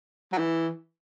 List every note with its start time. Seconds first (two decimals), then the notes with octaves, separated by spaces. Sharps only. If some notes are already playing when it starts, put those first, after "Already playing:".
0.32 F#3
0.38 E3